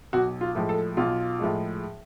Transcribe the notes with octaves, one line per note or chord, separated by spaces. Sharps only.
B1 F#4
F4
A2 F3 G#3
A4
B1 F4
A2 F3 G#3